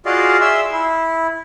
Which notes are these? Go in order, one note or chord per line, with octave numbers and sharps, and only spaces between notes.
F4 F#4 G#4 D5 D#5 F5
G#4 E5 C6 E6
E4